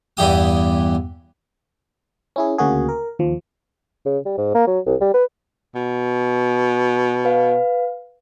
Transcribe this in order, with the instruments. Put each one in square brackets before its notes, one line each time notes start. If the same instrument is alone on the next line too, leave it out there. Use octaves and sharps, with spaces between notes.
[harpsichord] E2 G2 E3 G4 D#6
[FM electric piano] C#4 E4 G#4
D2 C#3 A#3 F#4 G#4
A#4
D#2 F3
[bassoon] C#3
G3
G#2
A#3
F#3
C2
G3
B4
[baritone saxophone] B2
[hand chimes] B4 F5